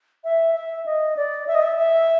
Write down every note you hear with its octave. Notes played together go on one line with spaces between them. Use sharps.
E5
E5
D#5
D5
E5
D#5
E5
E5